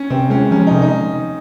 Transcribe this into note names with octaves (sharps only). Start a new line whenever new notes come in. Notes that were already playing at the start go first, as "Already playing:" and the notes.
Already playing: C#4
C3 C4
G#3 C#4
F3 C#4
C3 D#4
D#4